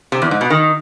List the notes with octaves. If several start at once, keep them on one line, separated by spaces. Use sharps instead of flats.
C3
E2
G#2
B2
D#3